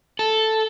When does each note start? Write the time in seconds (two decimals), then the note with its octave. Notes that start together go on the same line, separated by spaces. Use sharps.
0.19 A4